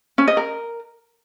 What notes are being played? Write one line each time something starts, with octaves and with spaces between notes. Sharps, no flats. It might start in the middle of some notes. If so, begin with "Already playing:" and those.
C#4
D#5
A#4